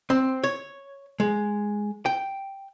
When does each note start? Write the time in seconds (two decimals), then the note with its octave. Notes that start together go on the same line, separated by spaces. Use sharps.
0.10 C4
0.44 C#5
1.20 G#3
2.06 G5